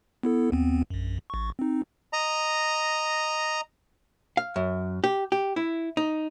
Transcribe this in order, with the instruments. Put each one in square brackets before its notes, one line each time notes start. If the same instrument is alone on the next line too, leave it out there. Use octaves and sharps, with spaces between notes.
[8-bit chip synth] B3 E4 A4
D#2 B3 C4
A#1 F#2
A1 C#6
C4 D#4
[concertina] D#5 A#5
[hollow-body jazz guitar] F5
F#2
G4
G4
E4
D#4